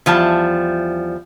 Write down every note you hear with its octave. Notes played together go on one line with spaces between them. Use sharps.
E2 F3 G3 A5